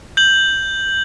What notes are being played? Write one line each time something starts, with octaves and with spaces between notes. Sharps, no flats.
G6 F#7